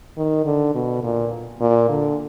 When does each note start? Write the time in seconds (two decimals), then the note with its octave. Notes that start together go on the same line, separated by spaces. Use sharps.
0.17 D#3
0.46 D3
0.75 B2
1.03 A#2
1.60 A#2
1.89 D3